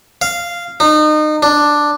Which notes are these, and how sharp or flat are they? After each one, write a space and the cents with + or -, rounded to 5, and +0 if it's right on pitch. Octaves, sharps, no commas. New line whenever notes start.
F5 -10
D#4 -30
D4 +5